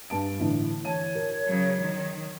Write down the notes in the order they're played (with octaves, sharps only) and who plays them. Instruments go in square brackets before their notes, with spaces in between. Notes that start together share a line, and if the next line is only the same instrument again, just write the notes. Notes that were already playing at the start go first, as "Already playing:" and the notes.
[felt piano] G2 A5 D7
A2 D3 E3
[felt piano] E3 A5 D#7 [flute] C#5
[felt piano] A#4
[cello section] C#3 F#3
D#3